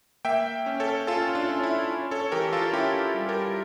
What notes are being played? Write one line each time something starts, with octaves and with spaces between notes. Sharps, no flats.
A#3 E5 G5
C#4
A4 C#5
C#4 F4 A4
D4 F4
C#4
E4
C#4
A4 C#5
E3 G4 A#4
F4 A4
C#4 E4 G4
G3
G4 A#4